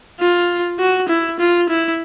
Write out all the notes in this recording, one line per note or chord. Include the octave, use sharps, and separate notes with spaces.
F4
F#4
E4
F4
E4